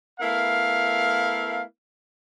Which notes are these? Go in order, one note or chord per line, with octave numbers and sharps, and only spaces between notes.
A3 B3 E4 A#4 F5